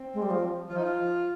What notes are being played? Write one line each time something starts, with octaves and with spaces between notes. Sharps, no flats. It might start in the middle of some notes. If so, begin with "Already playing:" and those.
Already playing: C4
G#3
G3
F3
F3 F4
D#4
F4